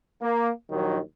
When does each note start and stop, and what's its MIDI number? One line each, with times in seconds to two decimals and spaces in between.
0.22 0.51 58
0.70 0.99 34
0.70 0.99 39
0.70 0.99 51
0.70 0.99 54